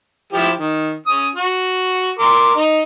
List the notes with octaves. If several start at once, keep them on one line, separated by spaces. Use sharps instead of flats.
F3 E4 G4
D#3
C#4 D#6
F#4
A#4 C6 D6
D#4